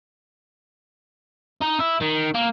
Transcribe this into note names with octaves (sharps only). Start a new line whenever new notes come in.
D#4
E4
D#3
A#3